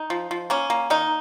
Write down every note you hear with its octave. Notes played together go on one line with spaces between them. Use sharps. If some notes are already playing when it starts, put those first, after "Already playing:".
Already playing: D#4
F3
F3
A#3 C#4
A#3
D#3 D#4